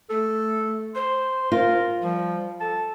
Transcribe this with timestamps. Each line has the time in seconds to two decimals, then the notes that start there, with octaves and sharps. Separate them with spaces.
0.10 A3 A4
0.95 C5 C6
1.52 F4 A#4
2.02 F3 G3
2.60 A4 A5